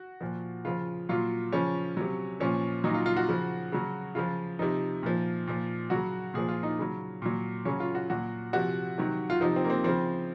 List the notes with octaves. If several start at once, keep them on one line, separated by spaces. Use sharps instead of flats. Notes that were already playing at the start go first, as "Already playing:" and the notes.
Already playing: F#4
A#2 F3
C#3 F3 F4
A#2 F#3 F4
C#3 F3 C#4
C3 F#3
A#2 F3 C#4
A#2 F#3 D#4
F4
F4
F#4
C#3 F3
C#3 F#3
C#3 F3 F4
C3 F3 D#4
A#2 F3
A#2 F3
C#3 F#3 F#4
A#2 F3 G#4
F4
D#4
C#3 F#3
A#2 F#3
C#3 F#3 C#4
F4
F#4
A#2 F#3 F#4
C3 F3 F#4
C3 D#3 F#3
F4
C3 F3 D#4
C4
A#3
C4
C#3 F3 C4